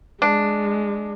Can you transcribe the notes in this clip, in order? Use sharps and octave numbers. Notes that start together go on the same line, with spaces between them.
G#3 D4